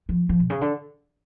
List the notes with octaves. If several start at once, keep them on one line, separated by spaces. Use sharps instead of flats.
F3
F3
B2
C#3
D3